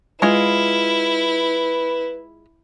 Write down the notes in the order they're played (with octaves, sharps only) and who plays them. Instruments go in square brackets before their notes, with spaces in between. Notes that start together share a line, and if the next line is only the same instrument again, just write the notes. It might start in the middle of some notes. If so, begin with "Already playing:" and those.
[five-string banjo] G#3 F4 [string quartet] E4 [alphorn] B4